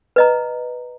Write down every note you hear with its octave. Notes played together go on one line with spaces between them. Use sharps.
B4 D#5 A#5